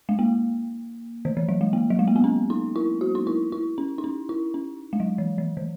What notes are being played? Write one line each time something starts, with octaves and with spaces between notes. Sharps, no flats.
G#3
A#3
D#3
E3
F#3
G#3
A#3
F#3
G#3
A#3
B3
C#4
D#4
E4
F#4
D#4
E4
E4
C#4
D#4
C#4
E4
C#4
G#3
F#3
E3
E3
D#3